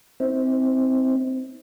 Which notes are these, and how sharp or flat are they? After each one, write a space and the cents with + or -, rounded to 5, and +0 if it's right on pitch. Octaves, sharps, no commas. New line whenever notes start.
C4 -5 E4 -45